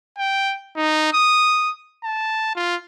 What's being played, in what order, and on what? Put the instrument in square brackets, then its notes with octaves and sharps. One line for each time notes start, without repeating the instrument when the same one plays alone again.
[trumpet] G5
D#4
D#6
A5
F4